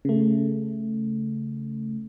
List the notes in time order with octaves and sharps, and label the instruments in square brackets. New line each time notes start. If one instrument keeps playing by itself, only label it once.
[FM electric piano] C#3 A3